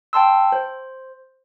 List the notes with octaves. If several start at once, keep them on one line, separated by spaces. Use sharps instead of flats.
G5 A5 C6 E6
C5